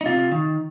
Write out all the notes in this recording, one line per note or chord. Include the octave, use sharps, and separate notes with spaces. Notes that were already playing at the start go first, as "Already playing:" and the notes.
D#4
C3 F4
D#3